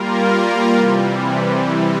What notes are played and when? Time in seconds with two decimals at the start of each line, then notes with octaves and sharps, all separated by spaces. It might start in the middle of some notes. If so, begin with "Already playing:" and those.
Already playing: G3 A#3 F4 A#4
0.74 C3 E3 G3